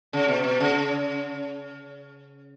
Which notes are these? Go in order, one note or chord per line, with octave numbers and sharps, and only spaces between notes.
C#3
B2
B2
C#3